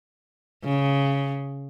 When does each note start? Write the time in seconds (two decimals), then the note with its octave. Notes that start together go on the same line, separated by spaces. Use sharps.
0.64 C#3